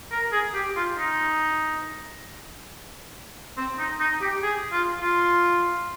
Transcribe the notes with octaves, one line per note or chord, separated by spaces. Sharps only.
A#4
G#4
G4
F4
D#4
C4
D#4
D#4
G4
G#4
F4
F4